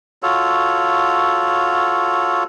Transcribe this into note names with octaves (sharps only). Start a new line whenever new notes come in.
F4 F#4 A4 C#5